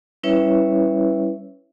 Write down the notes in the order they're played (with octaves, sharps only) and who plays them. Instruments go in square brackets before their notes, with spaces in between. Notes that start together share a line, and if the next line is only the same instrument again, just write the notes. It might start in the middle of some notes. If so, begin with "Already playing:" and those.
[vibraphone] G3 C#4 E4 B4 C#5 E5